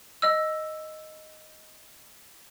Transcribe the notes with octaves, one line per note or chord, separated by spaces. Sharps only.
D#5 E6